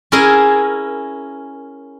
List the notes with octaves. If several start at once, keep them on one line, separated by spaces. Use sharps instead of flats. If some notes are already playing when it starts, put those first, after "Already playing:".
C#4 E4 G#4 A#4